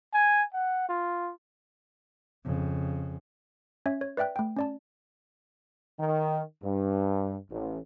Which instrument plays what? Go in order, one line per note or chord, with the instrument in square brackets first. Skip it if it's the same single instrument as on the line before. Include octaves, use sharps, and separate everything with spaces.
[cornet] G#5
F#5
F4
[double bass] F2 C#3
[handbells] C#4 C#5 E5
C#5
B4 D5 E5 G5 F#6
A3 G5
C#4 D5 A5
[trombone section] D#3
G2
A1